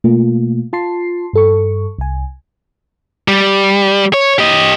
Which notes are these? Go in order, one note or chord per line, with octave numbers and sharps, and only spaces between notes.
B2 A3 A#3 F4
F4 A5 C6 C7
G2 A4 C#6
C2 G#5
G3
C#5
G4 D#5